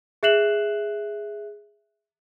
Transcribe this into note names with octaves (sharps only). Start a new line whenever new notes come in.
G#4 E5 F#6 C7 E7 F#7